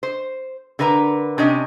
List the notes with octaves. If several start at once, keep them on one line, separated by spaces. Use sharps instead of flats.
C5
D3 A#4 B4 F5 A#5
C3 C#4 D4 D#5